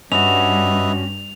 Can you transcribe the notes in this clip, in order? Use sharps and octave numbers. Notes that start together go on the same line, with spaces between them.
G2 C#4 F#4 B4 D#5 E5 F7